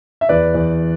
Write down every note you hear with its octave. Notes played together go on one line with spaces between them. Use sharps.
E5
E2 B4 D5
E2